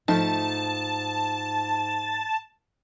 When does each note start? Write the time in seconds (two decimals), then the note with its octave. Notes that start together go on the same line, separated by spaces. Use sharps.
0.08 G#2 F3 A3 D#4 A5